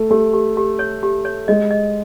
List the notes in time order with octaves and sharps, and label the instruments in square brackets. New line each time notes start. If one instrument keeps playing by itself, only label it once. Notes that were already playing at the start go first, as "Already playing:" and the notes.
Already playing: [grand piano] A3
[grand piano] A3 [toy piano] G4
[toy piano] G4
G4
C#5
G4
C#5
[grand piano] G#3 [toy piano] D#5
[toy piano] D#5